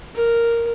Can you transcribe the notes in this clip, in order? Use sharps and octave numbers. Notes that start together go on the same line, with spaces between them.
A#4